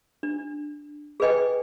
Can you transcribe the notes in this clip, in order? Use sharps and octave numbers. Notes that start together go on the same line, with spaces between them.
D4
G#4 A4 B4 D#5 G5 G#5